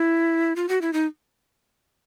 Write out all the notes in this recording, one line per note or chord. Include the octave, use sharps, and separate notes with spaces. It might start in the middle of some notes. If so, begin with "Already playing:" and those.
Already playing: E4
F4
F#4
E4
D#4